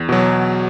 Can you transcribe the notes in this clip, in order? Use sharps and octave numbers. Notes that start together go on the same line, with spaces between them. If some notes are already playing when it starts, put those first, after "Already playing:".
Already playing: E2
B2 F#3